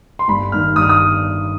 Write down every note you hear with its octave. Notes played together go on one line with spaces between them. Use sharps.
C6
G1 B5
G2 D#3 F6
G1 D#6
F6
D#6